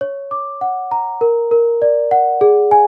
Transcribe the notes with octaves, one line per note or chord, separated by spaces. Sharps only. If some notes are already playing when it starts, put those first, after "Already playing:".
C#5
D6
F#5
A#5
A#4
A#4
D5
F#5
G#4
G#5